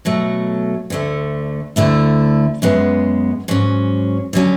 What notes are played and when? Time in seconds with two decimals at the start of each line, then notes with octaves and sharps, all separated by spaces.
0.05 B2 F#3 A3
0.90 D2 D3 A3
1.76 D2 D3 A3 E4
2.62 F#2 C#3 G#3 B3
3.48 G#2 F#3 C#4
4.33 D3 F#3 C#4